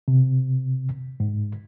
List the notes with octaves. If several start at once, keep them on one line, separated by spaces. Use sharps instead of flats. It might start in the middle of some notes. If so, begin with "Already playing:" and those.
C3
G#2